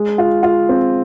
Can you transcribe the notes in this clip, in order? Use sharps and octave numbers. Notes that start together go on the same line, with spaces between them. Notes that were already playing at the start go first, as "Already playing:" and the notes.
Already playing: G#3
F4
F4
C4